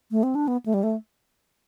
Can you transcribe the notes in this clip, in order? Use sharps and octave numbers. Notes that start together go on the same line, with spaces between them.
A3
C4
D4
B3
A3
G3
A3